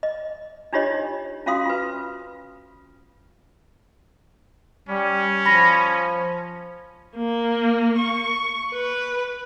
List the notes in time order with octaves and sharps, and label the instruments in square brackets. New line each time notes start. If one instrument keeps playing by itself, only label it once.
[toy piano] D#5
D4 D#4 F4 G4 C#5 D#5
C#4 F4 F#4 F5 C6 D#6
F4 B4
[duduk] G3 [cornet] C#4
[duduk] F3 [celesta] B5 A#6
[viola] A#3
C#6
B4